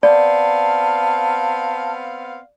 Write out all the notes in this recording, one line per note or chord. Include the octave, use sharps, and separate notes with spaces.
B3 C4 D5 F5 A5